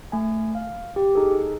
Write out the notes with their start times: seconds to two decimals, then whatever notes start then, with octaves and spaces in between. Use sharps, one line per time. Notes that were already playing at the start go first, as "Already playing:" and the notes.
0.12 A3 G#5
0.55 F5
0.96 G4
1.15 D#4 G#4 A4